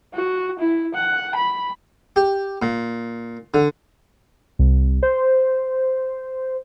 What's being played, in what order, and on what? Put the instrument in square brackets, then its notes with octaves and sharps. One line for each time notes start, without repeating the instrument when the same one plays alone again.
[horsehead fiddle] F#4
E4
F#5
B5
[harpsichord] G4
A#2
D3
[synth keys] C2
C5